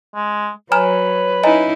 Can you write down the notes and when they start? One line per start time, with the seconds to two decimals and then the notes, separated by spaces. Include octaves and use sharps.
0.15 G#3
0.72 F#3 B4 C#5 G#5 A#5 F6
1.44 C#4 D#4 E4 D#5 G#5 A#5